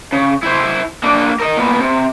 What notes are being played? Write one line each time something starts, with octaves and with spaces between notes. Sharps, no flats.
C#3
E4 C5
A#3 D4
A#4 D#5
A#2 B3
C3